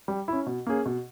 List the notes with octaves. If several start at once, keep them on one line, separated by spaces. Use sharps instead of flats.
G3
C#4 E4
B2
A#3 C#4 G#4
B2